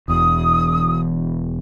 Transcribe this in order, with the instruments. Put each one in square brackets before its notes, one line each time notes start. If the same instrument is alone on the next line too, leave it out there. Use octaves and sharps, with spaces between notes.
[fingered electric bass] E1 E2 [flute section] D#6